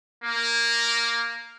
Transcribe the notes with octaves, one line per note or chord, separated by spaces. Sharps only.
A#3